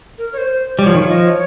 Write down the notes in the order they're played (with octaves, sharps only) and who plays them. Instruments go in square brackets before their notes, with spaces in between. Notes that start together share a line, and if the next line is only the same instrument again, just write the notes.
[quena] A#4
C#5
C5
[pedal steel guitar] G3 [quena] C#5
[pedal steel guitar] F3
[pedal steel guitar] D#3 [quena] C#5
[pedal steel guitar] F3
[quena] D#5
C#5